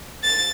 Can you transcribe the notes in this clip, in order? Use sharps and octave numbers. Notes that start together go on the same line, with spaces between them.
A6